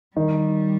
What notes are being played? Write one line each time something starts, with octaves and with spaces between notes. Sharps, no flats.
D#3 G3